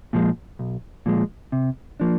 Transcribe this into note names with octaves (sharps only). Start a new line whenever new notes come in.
A#2 F3 G#3
B1
A#2 F3 G#3
C3
F3 A#3 D4